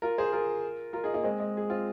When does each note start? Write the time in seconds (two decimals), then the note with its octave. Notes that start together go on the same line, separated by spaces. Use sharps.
0.02 F4 A#4
0.18 G#4 C5
0.32 F4 A#4
0.93 F4 A#4
1.04 D#4 G#4
1.14 A#3 D#4
1.23 G#3 C4
1.40 G#3
1.57 G#4
1.70 C4 F4